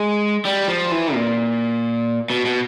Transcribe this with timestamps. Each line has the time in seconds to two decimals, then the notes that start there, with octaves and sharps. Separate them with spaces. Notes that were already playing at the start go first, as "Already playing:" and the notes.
Already playing: G#3
0.45 G3
0.68 F3
0.91 E3
1.14 A#2
2.30 B2
2.45 B2